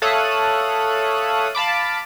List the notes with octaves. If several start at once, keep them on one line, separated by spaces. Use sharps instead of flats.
A4 C#5 E5 F5 D#6 F#6
F5 A5 B5 D6